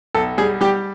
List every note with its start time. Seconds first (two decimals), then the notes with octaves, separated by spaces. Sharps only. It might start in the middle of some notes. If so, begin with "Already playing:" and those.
0.14 B1 A4
0.38 G3 G#4
0.61 G3 G4